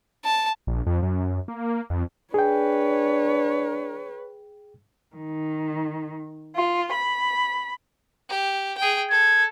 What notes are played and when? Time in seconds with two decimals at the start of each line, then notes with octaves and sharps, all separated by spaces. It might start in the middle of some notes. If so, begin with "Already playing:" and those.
0.25 A5
0.67 A#1
0.87 F2
1.03 F#2
1.48 A#3
1.90 F2
2.34 D4 G#4 B4 C#5 G5
5.16 D#3
6.56 F4
6.93 B5
8.29 G4
8.77 G#4 G5
9.11 A4 G#6